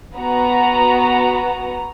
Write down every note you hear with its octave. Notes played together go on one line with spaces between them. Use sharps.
B3 F#4 A#5